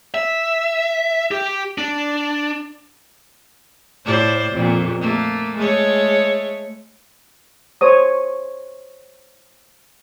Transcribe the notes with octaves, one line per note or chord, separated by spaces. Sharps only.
E5
G4
D4
A2 C5 D5
F2 A#2
A3 A#3
G#3 A3 C#5
C5 C#5 D#6